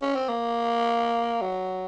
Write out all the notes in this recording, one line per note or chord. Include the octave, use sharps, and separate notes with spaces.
C#4
C4
A#3
F#3